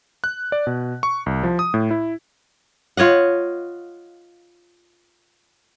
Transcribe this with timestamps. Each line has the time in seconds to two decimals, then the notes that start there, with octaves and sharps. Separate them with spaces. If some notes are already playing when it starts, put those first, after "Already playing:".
0.24 F#6
0.52 D5
0.67 B2
1.03 C#6
1.26 C2
1.43 F3
1.59 D#6
1.74 A2
1.91 E4
2.97 F4 C#5 D#5 F#5